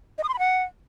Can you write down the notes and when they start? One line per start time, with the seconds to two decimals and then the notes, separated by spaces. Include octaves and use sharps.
0.18 D#5
0.23 D#6
0.29 C6
0.34 B5
0.39 F#5